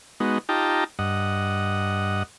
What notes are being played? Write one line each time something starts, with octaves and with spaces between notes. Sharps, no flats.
G#3 B3 D#4 F#4
D#4 F4 G4 G5 A5 A#5
G2 D#5 F#5